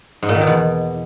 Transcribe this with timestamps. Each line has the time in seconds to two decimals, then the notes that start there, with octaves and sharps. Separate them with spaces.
0.23 G#2
0.29 A#2
0.35 D#3
0.41 B2
0.47 E2